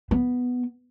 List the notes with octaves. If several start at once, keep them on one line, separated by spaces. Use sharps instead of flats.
B3